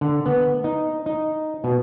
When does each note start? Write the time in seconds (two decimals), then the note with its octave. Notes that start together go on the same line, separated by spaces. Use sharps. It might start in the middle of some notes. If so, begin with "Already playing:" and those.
0.01 D3
0.26 B3
0.64 D#4
1.06 D#4
1.64 B2